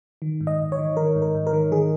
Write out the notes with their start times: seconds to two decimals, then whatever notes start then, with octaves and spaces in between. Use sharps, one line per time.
0.22 D#3
0.41 G#2
0.47 D#5
0.59 G#2
0.72 C#5
0.78 D#3
0.97 D#3 A#4
1.15 G#2
1.22 A#4
1.35 G#2
1.47 A#4
1.53 D#3
1.72 D#3 G#4